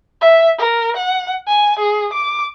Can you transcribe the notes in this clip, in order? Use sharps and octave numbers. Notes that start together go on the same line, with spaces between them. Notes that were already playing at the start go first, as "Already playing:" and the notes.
E5
A#4
F#5
G#5
G#4
D6